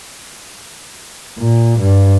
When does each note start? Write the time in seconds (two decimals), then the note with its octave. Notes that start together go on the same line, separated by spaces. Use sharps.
1.39 A#2
1.80 G2